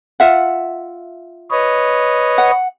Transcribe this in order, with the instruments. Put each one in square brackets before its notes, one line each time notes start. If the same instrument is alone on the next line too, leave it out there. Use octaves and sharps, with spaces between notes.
[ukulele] F4 E5 F#5
[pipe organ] B4 C#5 D#5
[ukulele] F#5